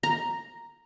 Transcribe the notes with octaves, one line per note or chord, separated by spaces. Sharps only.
A#5